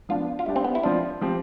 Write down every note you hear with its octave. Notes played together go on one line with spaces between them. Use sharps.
F3 B3 D4 F4
F4
G3 D4 E4 G4
C4
B3
E4
F3 C4 D4 F4
F3 C4 G4